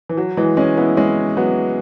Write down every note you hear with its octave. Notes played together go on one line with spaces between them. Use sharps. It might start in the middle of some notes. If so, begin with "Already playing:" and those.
E3
F#3
E3 G#3
G#3 C#4
B3 E4
G#3 C#4
F#3 B3